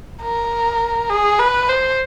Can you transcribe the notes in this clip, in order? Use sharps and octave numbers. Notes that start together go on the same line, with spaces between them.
A#4
G#4
B4
C5